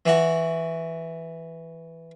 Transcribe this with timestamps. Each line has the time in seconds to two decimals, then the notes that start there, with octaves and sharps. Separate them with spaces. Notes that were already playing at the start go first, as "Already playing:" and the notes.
0.06 E3 F#4